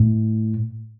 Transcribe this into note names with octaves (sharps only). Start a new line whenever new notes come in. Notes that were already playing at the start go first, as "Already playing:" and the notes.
Already playing: A2